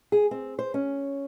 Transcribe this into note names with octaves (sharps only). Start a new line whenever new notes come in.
G#4
C4
C5
C#4